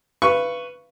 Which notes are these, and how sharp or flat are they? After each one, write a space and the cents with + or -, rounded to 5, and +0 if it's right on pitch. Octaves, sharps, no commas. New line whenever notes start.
B4 +5 F5 -35 C#6 +0